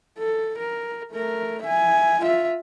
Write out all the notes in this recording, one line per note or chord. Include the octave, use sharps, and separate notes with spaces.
A4
A#4
A3 A#4
E5 G#5
F4 E5